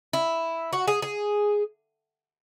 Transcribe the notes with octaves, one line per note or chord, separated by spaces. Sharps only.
E4
F#4
G#4
G#4